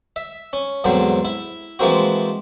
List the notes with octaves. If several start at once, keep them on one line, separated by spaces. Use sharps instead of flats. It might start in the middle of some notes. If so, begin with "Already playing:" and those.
E5
C#4
E2 G#2 D3 F#3 C4
E4
E3 F3 G#3 A#3 C4 F#4